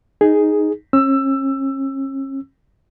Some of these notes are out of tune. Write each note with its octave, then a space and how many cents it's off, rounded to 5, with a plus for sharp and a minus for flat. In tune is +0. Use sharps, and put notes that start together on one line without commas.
D#4 +0 G#4 +0
C#4 -40 E6 +15